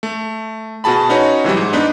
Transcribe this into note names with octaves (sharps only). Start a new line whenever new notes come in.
A3
B2 F#4 G#4 A5 B5
C#4 D#4 F#4 B4 C#5
C3 E3 F#3 G3
G#2
B3 D4 D#4 B4